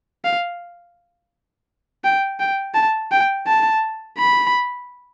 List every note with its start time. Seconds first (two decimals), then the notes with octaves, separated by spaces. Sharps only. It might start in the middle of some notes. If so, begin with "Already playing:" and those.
0.24 F5
2.04 G5
2.40 G5
2.75 A5
3.12 G5
3.47 A5
4.18 B5